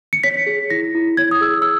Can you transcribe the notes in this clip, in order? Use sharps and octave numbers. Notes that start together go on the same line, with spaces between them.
C#7
C#5 B6
G#4
E4 A#6
E4
C#5 G#6
D#6
G#4 E6
E6